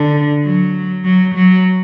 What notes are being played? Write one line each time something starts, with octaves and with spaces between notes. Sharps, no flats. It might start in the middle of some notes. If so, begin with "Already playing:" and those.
Already playing: D3
F#3
F#3
F#3